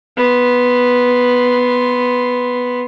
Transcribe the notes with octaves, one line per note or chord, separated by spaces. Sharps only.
B3 C6